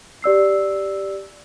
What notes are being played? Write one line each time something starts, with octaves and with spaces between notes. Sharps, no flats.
G4 D5 E6 C7